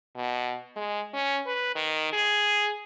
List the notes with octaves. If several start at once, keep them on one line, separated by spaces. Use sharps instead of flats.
B2
G#3
C#4
B4
D#3
G#4